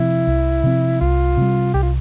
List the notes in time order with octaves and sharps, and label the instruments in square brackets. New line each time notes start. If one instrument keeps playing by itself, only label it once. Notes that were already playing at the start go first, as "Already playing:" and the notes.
Already playing: [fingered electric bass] C3 F3 C4 [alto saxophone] E4
[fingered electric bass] C2
C3 F3 C4
[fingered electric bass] C2 [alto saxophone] F4
[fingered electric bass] C3 G3
[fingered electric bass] C2 [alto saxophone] G4
[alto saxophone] F4